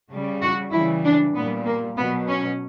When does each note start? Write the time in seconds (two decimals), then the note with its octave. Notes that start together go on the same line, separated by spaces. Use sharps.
0.11 C#3 G3
0.42 F#4
0.72 C#3 E3 G3 E4
1.04 D4
1.34 A#2 G3 B3
1.65 A#3
1.97 B2 F#3 B3
2.28 C#4